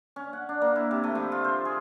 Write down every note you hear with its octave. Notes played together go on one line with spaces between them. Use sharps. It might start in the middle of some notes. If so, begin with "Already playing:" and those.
C#4
F#5
D4
A#3
E4
C3
A3
F3
F4
C5
G#4